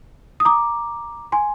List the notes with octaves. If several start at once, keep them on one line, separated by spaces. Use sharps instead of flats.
D#6
A#5 D6
G#5 C6